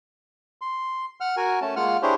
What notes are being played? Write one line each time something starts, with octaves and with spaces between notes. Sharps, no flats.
C6
F#5 F6
F#4 A#4 G#5
A3 C#4 A5
G#3 A#3 F4 F#5 F6
D4 E4 G4 G#4 C5 C#5